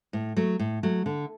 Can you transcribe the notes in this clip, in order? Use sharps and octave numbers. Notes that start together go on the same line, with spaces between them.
A2
F#3 A3
A2
F#3 A3
D3